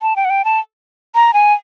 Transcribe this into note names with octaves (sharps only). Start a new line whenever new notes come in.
A5
G5
F#5
G5
A5
A#5
G#5